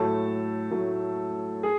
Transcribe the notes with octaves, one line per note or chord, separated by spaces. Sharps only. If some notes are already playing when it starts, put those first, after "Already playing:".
Already playing: A2 F#3 A3 A4 A5
A2 F#3 A3
G#4